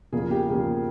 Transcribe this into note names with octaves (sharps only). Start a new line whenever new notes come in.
E2 C#3 F3 A#3 G#4
G4
E2 C#3 F3 A#3 G4